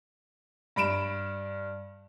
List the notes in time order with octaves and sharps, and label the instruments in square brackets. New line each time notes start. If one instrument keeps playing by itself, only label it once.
[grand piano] G2 B5 D7 E7